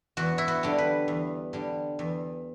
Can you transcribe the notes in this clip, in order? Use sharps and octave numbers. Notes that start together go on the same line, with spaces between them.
E2 F#4
E4
F#4
D3 G3
B4
E2
D3 G3
E2